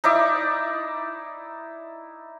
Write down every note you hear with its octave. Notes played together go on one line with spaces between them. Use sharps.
D#4 E4 D5 D6